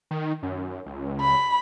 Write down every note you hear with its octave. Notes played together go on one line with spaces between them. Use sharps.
D#3
F#2
C#2
B5